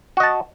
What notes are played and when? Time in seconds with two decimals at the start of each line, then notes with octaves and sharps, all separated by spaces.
0.17 F#4
0.20 D#5
0.23 A5